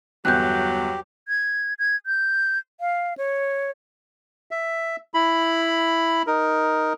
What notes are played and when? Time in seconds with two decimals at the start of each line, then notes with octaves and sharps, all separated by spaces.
0.25 G1 E2 F#3 G4 F#6 G6
1.28 G#6
1.79 G#6
2.06 G6
2.80 F5
3.18 C#5
4.51 E5
5.14 E4 B5
6.27 D#4 A#4